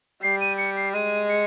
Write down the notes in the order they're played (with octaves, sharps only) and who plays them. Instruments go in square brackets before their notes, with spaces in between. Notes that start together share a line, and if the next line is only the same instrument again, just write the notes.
[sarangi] G3 [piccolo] C7
[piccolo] D#7
C#7
C7
[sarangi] G#3 [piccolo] D#7
[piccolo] C#7